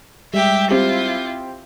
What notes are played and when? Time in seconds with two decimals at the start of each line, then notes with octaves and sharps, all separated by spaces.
0.34 G3 G#3 G4 E5
0.71 C4 E4 F4 G4